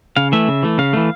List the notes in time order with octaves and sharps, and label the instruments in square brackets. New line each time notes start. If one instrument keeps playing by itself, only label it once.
[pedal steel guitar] C#3 F5
E3 A3 E5
C#3
E3 A3
C#3 F5
E3 A3